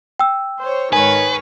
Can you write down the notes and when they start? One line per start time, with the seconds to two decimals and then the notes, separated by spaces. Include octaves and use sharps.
0.19 G5 E6
0.60 C5 C#5
0.93 G#2 D#3 B4 C#5 G#5